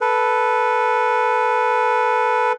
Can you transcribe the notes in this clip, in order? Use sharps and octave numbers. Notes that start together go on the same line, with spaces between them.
A4 B4